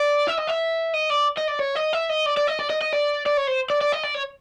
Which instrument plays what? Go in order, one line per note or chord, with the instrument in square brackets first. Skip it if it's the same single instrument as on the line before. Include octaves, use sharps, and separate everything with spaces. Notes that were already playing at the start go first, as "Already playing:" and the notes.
Already playing: [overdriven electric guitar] D5
E5
D#5
E5
D#5
D5
D#5
D5
C#5
D#5
E5
D#5
D5
D5
D#5
D5
D#5
D#5
D5
D5
C#5
C5
D5
D5
D#5
D5
C#5